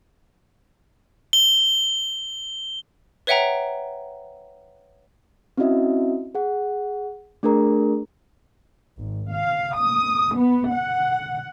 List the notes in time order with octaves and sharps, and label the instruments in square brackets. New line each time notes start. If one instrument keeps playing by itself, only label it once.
[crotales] G7
[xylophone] B4 C#5 E5 F#5 G5 A#5
[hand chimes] C4 C#4 E4 F#4 D#5 E5
G#4 F#5
A3 D4 G#4 A#4 A#5
[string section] G#1
F5
D#6
B3
F#5